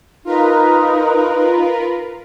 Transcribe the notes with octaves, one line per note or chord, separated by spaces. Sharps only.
D#4 F4 A#4 B4